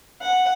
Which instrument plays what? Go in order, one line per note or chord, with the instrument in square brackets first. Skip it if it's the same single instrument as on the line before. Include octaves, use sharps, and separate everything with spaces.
[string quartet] F#5